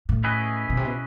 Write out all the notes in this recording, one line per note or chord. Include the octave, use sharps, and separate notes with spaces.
A2
C#4 E4 G#4 B4 D#5
B2
C3
B2